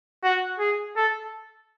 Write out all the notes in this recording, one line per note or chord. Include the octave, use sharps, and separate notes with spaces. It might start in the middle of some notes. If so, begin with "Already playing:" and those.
F#4
G#4
A4